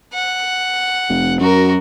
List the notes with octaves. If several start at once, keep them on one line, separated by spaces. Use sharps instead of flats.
F#5
F1
F#2 F#4 A#4